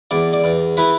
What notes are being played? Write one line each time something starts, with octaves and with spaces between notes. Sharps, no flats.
E2 D5
D5
E2
E3 B4